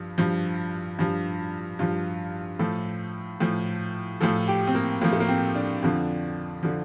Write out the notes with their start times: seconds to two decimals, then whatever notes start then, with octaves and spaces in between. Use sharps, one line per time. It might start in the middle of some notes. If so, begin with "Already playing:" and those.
Already playing: G2 F3
0.18 G2 F3
0.99 G2 F3
1.79 G2 F3 F4
2.59 A2 F3 A4
3.40 A2 F3
4.21 A2 F3 A4
4.48 G4
4.67 C4
4.75 A#3
5.02 A2 F3 A#3
5.13 A3
5.20 A#3
5.28 C4
5.55 D4
5.82 F2 D3 F3
6.63 D3 F3